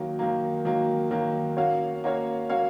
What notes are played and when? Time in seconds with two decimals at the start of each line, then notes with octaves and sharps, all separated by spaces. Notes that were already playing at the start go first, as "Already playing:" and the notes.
Already playing: D#3 F#3 A#3
0.19 D#3 F#3 A#3
0.65 D#3 F#3 A#3
1.11 D#3 F#3 A#3
1.57 A#3 C#4 F#4 C#5 F5
2.04 A#3 C#4 F#4 C#5 F5
2.50 A#3 C#4 F#4 C#5 F5